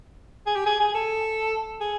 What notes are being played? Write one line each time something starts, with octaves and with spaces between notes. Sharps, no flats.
G#4
G4
G#4
G#4
A4
G#4